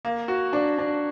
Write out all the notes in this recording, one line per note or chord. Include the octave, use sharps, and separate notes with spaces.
A#3
F#4
D4
D4